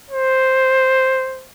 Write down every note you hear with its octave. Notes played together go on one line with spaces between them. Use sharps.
C5